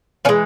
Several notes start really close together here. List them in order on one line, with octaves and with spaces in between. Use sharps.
E3 C#4 G#3